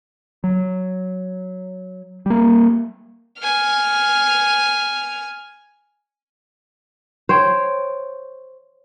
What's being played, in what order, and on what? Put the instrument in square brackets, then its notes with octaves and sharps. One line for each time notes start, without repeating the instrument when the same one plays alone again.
[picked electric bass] F#3
G3 A#3
[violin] G#5 F6
[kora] C5 C#5 G5